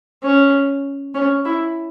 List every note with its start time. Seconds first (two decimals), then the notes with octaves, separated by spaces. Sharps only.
0.24 C#4
1.14 C#4
1.45 E4